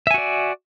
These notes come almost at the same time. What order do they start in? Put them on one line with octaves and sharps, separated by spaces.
E5 G#5 F#4 D5